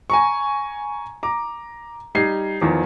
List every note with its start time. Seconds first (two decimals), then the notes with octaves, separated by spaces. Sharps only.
0.10 G#5 A#5 C#6
1.23 A#5 D6
2.15 G3 D#4 G#6 C7
2.61 E2 D#3 F3